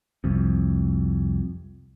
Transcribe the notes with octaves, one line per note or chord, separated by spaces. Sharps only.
C2 F2